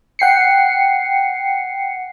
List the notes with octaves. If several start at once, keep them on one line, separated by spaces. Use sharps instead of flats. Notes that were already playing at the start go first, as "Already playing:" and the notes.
F#5 G5 C7 C#7